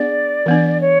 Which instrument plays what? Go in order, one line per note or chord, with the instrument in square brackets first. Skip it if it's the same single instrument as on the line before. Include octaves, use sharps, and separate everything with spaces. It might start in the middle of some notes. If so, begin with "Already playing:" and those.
Already playing: [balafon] B3 D4 G#4 [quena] D5
[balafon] E3 B3 D4
[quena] C#5